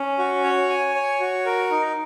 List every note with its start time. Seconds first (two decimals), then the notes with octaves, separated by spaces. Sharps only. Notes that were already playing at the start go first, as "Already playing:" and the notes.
Already playing: C#4
0.19 F#4
0.44 C#5
0.70 G#5
0.95 C#5
1.21 F#4
1.46 A#4
1.71 D#4